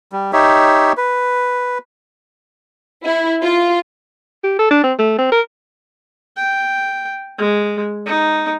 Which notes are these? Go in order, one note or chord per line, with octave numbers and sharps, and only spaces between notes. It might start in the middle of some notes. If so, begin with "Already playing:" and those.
G3
D#4 G4 C#5 E5
B4
E4
F4
G4
A4
D4
C4
A3
C4
A#4
G5
G#3
D#4